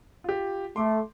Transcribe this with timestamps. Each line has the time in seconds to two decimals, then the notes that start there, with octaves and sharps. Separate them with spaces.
0.24 F4 G4
0.76 A3 C6 D6